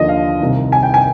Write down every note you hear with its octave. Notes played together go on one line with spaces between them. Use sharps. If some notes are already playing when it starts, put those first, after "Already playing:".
Already playing: D#2 D3 F3 D#5
F5
C2 C3 D#3
G#5
G5
G#5